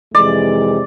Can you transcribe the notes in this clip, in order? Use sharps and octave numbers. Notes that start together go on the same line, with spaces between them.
F2 C3 E3 G#3 D5